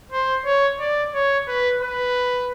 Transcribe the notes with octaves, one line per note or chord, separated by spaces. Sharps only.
C5
C#5
D5
C#5
B4
B4